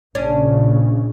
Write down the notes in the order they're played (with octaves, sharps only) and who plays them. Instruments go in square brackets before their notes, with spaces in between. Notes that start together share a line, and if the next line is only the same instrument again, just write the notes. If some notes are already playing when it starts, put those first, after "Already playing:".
[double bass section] A#1 C#3 [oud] C#4 D4